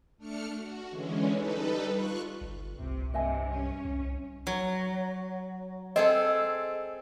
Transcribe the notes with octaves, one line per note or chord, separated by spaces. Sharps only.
A3 D4 F6 C#7
F#4
D3 E3 G#3 C#4
G3 D#4 A4 B4
F4 C#6 F#6
G1
C2 C3
G2 C3 D#5 E5 G#5
C#4
C2
F#3
C4 G#4 A4 D#5